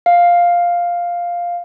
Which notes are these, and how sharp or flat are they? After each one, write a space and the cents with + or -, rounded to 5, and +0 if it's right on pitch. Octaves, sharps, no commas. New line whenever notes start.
F5 +0